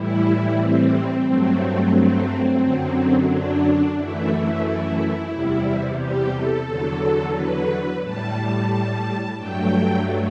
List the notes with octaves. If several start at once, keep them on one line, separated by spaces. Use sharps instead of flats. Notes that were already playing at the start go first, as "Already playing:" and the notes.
Already playing: A2 E3 G3 E4
C4
G2 F#3 A3 C4
C4
F#2 D3 F#3
D4
F#2 E3 A3 E4
E2 C3 G3
G4
A4
E2 D3 F#3 A4
B4
A2 G3 A5
G2 F#3 A3 G5